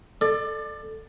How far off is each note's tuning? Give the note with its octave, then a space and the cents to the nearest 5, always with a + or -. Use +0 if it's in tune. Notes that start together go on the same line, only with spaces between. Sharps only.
A4 +0 D5 +25